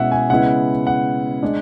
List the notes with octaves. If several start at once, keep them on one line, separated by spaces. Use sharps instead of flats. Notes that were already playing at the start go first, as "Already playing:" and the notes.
Already playing: B2 G#3 C#4 E4 E5 F#5
G#5
C#3 G#3 B3 E4 F#5
F#5
G#3 D4